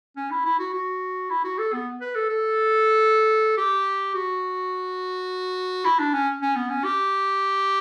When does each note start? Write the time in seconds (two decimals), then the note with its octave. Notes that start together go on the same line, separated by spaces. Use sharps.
0.16 C#4
0.31 E4
0.45 E4
0.59 F#4
0.73 F#4
1.30 E4
1.44 F#4
1.58 A4
1.73 B3
2.01 B4
2.15 A4
2.30 A4
3.57 G4
4.14 F#4
5.85 E4
5.99 D4
6.14 C#4
6.42 C#4
6.56 B3
6.70 C#4
6.84 G4